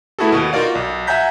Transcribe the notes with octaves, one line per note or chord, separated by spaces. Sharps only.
A3 B3 E4 F#4 G#4 A4
D#2 B2
D#4 F4 F#4 A#4 D5 F5
B1
E5 F#5 G#5 A#5 G6 B6